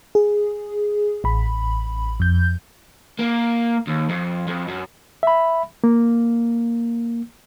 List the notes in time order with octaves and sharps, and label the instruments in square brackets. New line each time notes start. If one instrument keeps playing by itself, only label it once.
[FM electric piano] G#4
A1 B5
F2 G6
[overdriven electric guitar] A#3
D#2
F2
F2
F#2
[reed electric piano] E5 B5
A#3